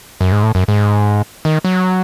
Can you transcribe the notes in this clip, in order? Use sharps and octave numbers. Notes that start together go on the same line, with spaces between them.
F#2
G#2
A2
F#2
G#2
D#3
F#3